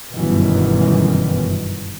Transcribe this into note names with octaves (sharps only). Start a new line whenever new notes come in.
G1 F#2 B2 D#3 E3